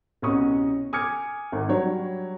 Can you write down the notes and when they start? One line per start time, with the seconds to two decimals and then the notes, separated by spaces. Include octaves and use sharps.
0.22 C2 B2 C#4 C#6 D#6
0.93 G#5 D6 D#6 F6 G#6 C#7
1.52 G#1
1.69 F#3 G3 D4 C#5